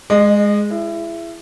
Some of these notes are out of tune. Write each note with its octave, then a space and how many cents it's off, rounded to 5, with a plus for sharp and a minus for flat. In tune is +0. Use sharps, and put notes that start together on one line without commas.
G#3 +0 D#5 -30
E4 +25 G#4 +0